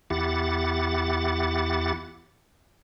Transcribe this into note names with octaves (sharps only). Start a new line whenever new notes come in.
E2 E4 G4 F#5 A6